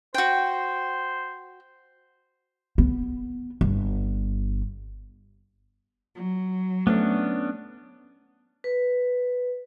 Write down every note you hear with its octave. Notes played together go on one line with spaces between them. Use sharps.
F#4 C5 G5
B3
G1
F#3
A3 B3 C#4 D4
B4